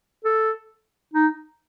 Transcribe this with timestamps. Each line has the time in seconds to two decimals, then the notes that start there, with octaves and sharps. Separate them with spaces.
0.24 A4
1.14 D#4